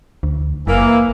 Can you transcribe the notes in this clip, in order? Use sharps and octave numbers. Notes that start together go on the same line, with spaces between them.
D2
F#1 E3 A#3